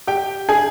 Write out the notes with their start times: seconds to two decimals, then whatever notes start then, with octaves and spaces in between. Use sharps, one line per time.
0.07 G4 G5
0.49 G#4 G#5